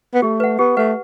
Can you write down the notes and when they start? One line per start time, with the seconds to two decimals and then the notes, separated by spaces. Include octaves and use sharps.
0.14 B3
0.22 A3 G4
0.40 B4 F#5
0.59 B3 G4
0.77 A3 B4 F#5